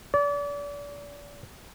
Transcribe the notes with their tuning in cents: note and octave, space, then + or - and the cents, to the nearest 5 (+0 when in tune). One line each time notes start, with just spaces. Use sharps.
D5 -35